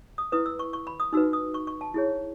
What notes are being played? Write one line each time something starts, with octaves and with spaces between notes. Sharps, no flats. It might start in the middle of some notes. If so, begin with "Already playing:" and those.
D#6
E4 B4 D#6
E6
C#6
C#6
B5
D#6
D#4 F#4 B4 E6
D#6
C#6
C#6
A5
E4 G#4 C#5